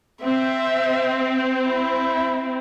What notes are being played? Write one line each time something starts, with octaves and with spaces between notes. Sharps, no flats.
C4 E5
E4